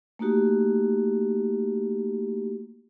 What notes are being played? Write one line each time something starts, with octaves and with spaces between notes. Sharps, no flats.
A3 A#3 D#4 F#4 G4